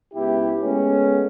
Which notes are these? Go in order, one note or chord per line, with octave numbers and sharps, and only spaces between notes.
C#2 B3 E4 G4
G#3 A3 B3 C#4